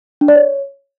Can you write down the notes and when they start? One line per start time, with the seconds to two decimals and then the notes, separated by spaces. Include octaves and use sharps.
0.21 D4
0.28 D5
0.36 C#5